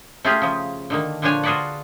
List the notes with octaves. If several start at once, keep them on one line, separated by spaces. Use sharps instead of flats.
A3 C#4 F4 G4 G#4
C#3 F3
D3 D#3 A#3
A#2 D3 F3 D4 C#5 G#5
F4 F#4 G#4 B4 D5 F#5